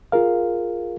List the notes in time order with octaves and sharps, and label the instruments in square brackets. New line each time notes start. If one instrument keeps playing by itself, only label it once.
[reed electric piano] F4 G#4 A#4 F5